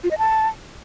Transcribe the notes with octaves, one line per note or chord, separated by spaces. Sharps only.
F4
D#5
A5